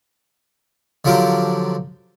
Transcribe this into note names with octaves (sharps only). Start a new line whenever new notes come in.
D3 F3 F#3 G4 A#4